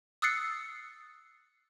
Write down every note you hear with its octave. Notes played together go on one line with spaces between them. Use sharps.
D#6 E6 F#6 A6 C7 C#7